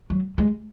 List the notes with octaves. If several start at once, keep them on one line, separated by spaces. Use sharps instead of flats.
F#3
G#3